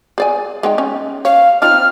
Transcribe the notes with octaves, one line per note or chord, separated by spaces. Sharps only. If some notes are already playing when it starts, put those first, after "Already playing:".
G#4 D5 G#5
G#3 D#4 G5
C#4
C#5 F5
C4 D#4 F4 F6